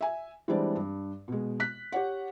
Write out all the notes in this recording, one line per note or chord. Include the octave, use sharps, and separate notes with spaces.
E5 G#5
E3 G3 G#3 C4 D4 D5
G2
B2 G#3
F#6 B6
G4 C#5 F#5